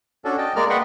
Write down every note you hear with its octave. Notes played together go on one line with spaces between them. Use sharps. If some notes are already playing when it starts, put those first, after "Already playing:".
C#4 D4 F#4 A4
D#5 G5 A5
G#3 A#3 A#4 D5 F6
B4 D#5 F#5 G5 C6 C#6